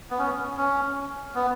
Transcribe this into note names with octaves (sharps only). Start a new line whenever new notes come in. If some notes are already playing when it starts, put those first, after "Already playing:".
B3
C#4
C#4
B3